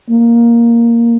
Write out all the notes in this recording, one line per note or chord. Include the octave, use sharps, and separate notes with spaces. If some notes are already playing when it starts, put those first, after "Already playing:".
A#3